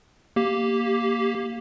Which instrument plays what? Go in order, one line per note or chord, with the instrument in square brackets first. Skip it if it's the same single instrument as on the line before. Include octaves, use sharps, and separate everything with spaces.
[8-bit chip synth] A#3 G4